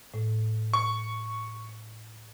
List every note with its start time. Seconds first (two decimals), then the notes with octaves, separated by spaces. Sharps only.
0.14 A2
0.74 C#6